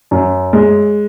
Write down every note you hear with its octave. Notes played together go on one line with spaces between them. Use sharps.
F#2
G#3